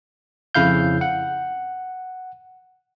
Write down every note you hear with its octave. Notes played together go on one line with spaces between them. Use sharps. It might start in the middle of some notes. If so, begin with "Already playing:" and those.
F2 C#3 E4 F5 G6
F#5